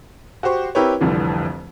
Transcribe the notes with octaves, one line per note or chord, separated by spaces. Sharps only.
F#4 G4 C5 C#6
C4 E4 G4 A#4 B4 C#5
F1 C2 F2 D3 E3